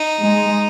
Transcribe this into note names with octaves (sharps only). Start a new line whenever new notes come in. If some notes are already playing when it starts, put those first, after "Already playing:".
Already playing: D#4
G#3